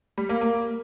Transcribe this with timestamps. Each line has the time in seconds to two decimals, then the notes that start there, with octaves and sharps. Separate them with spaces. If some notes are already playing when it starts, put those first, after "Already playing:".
0.18 G3
0.29 A#3
0.41 A#3